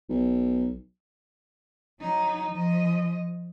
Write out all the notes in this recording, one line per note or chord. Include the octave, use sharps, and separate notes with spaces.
B1
F#3 D#4
F3 D#5